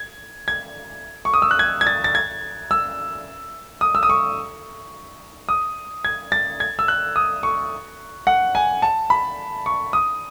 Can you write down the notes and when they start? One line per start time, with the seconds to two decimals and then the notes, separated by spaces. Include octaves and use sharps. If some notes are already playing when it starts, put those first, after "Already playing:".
Already playing: G#6
0.48 G#6
1.25 C#6
1.34 D#6
1.42 E6
1.51 F#6
1.59 G#6
1.81 G#6
1.87 A6
2.04 A6
2.15 G#6
2.71 E6
3.81 D#6
3.95 E6
4.03 D#6
4.10 C#6
5.49 D#6
6.05 G#6
6.32 A6
6.60 G#6
6.79 E6
6.88 F#6
7.16 D#6
7.43 C#6
8.27 F#5
8.55 G#5
8.82 A5
9.10 B5
9.66 C#6
9.93 D#6